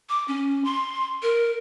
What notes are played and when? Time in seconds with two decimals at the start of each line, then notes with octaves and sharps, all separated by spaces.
0.09 D6
0.28 C#4
0.65 C6
1.23 A#4